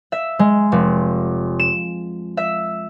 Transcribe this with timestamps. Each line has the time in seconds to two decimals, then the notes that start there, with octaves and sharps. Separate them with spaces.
0.12 E5
0.39 G#3
0.72 F1
1.59 E7
2.37 E5